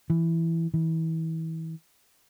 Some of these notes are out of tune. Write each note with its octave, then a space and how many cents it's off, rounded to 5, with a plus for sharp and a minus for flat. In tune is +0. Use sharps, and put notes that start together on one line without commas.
E3 +5
E3 -30